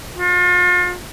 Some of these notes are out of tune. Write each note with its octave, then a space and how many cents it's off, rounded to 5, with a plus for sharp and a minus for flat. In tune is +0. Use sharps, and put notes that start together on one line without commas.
F4 +40